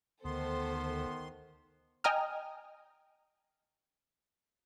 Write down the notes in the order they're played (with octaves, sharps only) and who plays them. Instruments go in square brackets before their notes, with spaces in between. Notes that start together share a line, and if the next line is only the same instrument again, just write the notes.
[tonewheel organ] D2 [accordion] D#3 C6 [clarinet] B3 [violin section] A4 C5
[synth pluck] D#5 G5 G#5 A#5 D#6 F6